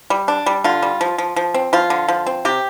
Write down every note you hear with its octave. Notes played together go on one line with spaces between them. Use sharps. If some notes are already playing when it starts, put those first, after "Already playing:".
G3
D4
G3
D3 F4
G3
F3
F3
F3
C4
F3 F4
D3
F3
C4
C3 G4